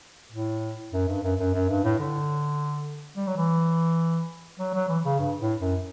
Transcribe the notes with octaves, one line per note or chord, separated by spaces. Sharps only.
A2
F#2
G2
F#2
F#2
F#2
G2
A2
D3
G3
F#3
E3
F#3
F#3
E3
C#3
G2
A2
F#2